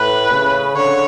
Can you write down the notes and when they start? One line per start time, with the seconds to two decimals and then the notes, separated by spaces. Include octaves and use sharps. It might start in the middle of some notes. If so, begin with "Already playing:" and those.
Already playing: A2 B4
0.32 C#3
0.76 D3 C#5